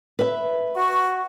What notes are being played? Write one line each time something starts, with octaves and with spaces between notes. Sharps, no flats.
B4 E5
F#4 C#6